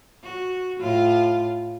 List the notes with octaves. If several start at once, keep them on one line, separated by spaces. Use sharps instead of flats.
F#4
A2 F4